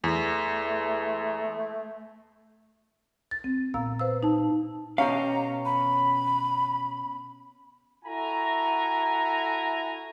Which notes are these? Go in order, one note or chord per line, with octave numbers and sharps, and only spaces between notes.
E2 A3
A6
C4
A#2 B3 F5 A#5 E6
B4 C5 F5 E6
D#4 A5
B2 C#4 G4 F5 A#5
B5
E4 F#4 A4 G#5 A#5